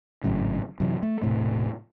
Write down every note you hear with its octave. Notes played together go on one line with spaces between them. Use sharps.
G#1 F#2 A2 C#3
F#2 C3 E3
A3
E1 A2 C3 A3